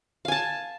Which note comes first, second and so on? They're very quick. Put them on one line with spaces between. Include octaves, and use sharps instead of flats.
F5 G#5 A5